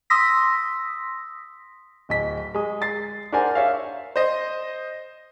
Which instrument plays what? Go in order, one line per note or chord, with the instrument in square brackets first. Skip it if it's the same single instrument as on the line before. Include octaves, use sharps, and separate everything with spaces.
[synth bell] C6 D#6 E6 A#6 B6
[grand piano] D1 D#5 B6
G#3 D#6
A6 C7
D4 G#4 A#4 C5 F#5 G#5
C#5 E5 F5
[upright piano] C5 D#5